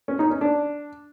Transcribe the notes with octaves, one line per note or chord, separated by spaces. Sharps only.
C#4
D#4
C#4
D4